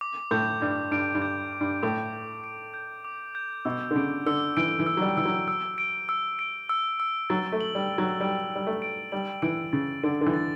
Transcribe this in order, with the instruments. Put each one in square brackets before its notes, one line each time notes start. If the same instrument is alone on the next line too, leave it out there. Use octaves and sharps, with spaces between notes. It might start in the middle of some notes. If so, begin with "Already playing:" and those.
[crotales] D6
[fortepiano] A2 [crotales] G6
[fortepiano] G2 [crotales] G6
[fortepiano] G2 [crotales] D7
[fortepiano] G2
[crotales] G6
D6
[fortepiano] G2
[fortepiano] A2 [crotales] D6
[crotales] G6
D7
G6
D6
G6
[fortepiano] B2 [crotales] E6
[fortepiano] D3
[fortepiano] C#3 [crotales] D7
[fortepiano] D3 [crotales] E6
[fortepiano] E3 [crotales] D7
[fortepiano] E3
[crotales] E6
[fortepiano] F#3
G3
[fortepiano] E3 [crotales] E6
[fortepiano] F#3
[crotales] E6
D7
E6
D7
E6
E6
[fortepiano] F#3 [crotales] A6
[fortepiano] A3
[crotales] F#7
[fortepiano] G3
[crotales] D7
[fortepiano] F#3
[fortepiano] G3 [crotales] D7
[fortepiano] G3 [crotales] D7
[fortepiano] A3
[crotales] D7
[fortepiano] G3 [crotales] F#7
[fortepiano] E3 [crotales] D7
[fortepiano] C#3 [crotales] A6
[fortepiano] D3 [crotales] D7
[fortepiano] D3
E3
[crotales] A6